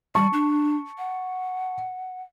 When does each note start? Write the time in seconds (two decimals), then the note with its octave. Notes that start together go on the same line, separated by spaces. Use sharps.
0.15 G3 A5 C#6
0.33 D4
0.98 F#5